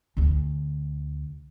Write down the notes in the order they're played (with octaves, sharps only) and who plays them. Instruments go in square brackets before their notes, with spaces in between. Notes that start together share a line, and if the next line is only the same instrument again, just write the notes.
[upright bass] D2 D3